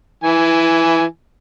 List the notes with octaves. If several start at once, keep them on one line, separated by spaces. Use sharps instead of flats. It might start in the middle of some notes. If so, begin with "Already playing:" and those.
E3 G#5